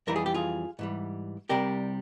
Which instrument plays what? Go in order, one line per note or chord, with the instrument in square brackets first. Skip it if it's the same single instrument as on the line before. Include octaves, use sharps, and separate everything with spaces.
[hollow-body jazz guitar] F2 E3 G3 A#4
G#4
G4
F4 G#4
G#2 E3 G3
C2 C3 G3 G4 A#4